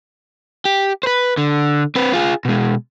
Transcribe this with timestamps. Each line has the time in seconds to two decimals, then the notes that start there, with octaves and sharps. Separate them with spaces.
0.65 G4
1.03 B4 C5
1.37 D3
1.95 C4 B4
2.13 F4 G#4
2.45 B2 G#3